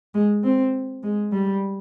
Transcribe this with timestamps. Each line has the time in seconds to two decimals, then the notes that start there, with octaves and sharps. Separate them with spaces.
0.15 G#3
0.43 C4
1.03 G#3
1.32 G3